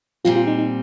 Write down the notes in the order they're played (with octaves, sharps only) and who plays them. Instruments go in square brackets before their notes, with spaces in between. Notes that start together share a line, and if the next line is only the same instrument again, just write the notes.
[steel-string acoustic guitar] A#2 G3 C4 [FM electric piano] F4
[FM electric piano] F4
D#4
D#4